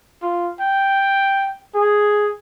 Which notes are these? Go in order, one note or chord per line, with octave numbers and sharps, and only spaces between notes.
F4
G5
G#4